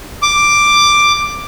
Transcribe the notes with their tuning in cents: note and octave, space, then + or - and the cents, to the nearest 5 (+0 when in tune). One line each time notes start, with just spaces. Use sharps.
D6 +5